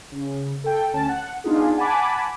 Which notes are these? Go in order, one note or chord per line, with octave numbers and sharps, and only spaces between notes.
C#3
A4 G5
D2 C#4 A5
F#5
B3 D4 D#4 F4 G#4
F#5 G#5 A5 B5 D6